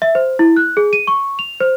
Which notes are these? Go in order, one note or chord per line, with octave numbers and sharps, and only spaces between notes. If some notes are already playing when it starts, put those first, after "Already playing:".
E5
C5
E4
F#6
G#4
D#7
C#6
F7
C5